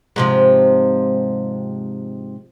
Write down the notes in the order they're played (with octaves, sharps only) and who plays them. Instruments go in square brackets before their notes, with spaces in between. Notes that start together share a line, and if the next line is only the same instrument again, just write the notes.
[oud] G#2 C3 F3